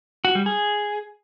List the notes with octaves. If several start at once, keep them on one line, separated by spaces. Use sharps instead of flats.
F#4
G3
G#4